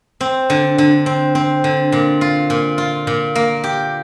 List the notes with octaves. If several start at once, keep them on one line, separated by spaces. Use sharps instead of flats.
C4
D3
D3
C4
C4
D3
A#2
F4
A#2
F4
A#2
A#3
G4